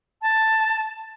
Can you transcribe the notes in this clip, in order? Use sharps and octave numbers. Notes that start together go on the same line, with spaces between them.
A5